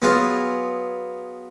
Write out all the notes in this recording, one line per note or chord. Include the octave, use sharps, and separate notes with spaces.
F#3 B3 F4 G#4